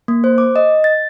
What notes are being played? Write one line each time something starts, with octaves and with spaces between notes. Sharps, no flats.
A#3
C5
D6
D#5
A6